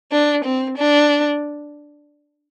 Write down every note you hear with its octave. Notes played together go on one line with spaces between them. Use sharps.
D4
C4
D4